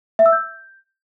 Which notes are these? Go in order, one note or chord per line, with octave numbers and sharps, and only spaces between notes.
E5
E6
G6